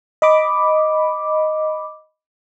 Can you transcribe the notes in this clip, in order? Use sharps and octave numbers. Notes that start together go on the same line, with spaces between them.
D#5 B5 D6